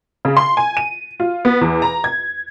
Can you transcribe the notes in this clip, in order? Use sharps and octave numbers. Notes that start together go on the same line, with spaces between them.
C#3
C6
G#5
D#7
F4
B3
E2
A#5
G#6